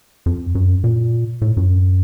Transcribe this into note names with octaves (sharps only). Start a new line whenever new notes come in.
F2
F#2
A#2
A2
F#2